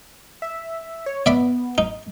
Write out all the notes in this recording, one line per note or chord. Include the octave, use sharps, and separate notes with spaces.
E5
C#5
B3 D5 E5 B5
D#4